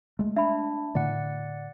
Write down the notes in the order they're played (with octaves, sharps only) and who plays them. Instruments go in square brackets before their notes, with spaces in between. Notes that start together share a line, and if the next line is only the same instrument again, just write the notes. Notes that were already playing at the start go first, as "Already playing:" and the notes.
[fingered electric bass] G#3 A3
[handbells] D4 [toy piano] E5 B5
[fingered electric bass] A2 D3 A3 [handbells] D5 F#5